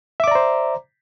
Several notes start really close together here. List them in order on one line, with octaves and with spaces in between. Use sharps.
E5 D6 D5 A#5 C5